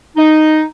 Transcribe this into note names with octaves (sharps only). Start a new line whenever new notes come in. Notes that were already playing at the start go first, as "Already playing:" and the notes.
D#4